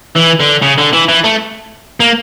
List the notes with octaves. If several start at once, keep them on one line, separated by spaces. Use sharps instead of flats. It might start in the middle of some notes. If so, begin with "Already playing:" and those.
E3
D3
C#3
D3
E3
E3
A3
A#3